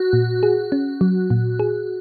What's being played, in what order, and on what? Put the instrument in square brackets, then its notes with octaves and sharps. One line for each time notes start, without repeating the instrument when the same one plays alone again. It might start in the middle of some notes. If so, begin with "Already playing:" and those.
Already playing: [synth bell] F#4
[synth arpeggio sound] A#2
G#4
C#4
F#3
A#2
G#4